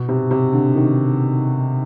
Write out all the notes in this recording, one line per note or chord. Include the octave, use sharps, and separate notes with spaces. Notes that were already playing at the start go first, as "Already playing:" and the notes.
Already playing: B2
C3
C3
D3
D#3